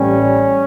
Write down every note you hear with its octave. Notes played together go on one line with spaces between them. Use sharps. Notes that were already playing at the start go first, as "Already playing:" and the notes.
Already playing: A1 A2 G3 C#4